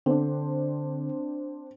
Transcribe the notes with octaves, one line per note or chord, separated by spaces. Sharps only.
D3 C4 D4